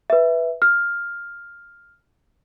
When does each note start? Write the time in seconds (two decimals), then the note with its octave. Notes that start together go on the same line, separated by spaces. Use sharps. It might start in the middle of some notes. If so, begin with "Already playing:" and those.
0.10 B4 E5
0.62 F6